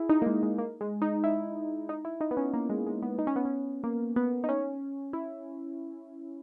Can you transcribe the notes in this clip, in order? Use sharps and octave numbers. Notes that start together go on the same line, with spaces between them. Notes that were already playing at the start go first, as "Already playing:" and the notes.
Already playing: E4 G#4
D#4
A#3
G#3
G#3
A#3
G#3
D#4
E4
D#4
E4
D#4
B3
C#4
A#3
G#3
G#3
B3
D#4
C#4
B3
C#4
A#3
B3
D#4
C#4
E4